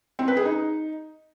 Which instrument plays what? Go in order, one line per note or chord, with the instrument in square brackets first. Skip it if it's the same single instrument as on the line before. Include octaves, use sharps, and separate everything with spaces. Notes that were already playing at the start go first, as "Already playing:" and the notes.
[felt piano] C4
B4
G#4
D#4